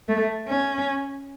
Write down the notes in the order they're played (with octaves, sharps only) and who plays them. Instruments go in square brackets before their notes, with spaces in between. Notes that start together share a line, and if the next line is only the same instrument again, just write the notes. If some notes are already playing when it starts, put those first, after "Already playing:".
[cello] A3
C#4